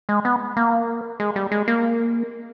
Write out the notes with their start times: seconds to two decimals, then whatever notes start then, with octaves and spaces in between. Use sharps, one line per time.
0.09 G#3
0.25 B3
0.57 A#3
1.20 G#3
1.36 G3
1.52 G#3
1.68 A#3